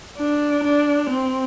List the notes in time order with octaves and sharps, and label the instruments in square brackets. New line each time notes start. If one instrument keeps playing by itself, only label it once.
[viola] D4
D4
C4